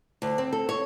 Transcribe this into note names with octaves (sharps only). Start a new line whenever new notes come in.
D2
C4
A4
C#5